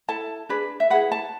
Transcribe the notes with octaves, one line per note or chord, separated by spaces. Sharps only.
E4 A4 A5
D4 G#4 B4
E5
E4 G#4 B4 F#5
A5